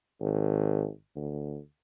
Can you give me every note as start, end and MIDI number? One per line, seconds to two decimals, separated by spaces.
0.21 0.87 32
1.16 1.58 38